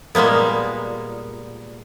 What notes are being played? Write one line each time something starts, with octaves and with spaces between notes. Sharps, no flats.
A#2 G3 G#3 A#3 B3